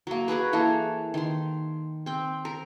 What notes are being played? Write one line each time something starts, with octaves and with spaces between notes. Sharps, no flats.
F#3 A#3
F#4 G#4 A#4 B4
E3 A#3 G#4 A4
D#3 C6
C4 G5
A#4